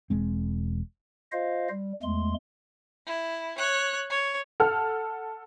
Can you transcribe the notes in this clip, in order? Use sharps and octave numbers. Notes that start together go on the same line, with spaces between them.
E1 G#3 C4
F4 C5 D#5 F5
G3
E2 G#3 A3 C6
E4
C#5 F#6
C#5
A4 F#5 F6